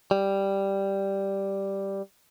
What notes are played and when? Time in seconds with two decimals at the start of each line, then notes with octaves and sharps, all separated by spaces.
0.11 G3